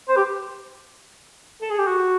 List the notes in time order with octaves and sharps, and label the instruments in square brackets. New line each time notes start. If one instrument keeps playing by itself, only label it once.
[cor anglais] C5
G4
A4
G#4
G4
F#4